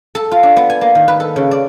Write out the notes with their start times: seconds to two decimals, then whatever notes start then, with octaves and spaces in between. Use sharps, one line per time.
0.15 A4
0.31 F4
0.43 D4
0.56 B3
0.70 G#5
0.81 A#3
0.95 D#3
1.08 B4
1.20 A4
1.36 C#3
1.51 D5